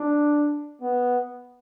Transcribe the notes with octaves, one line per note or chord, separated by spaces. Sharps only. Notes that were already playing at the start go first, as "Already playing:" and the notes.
Already playing: D4
B3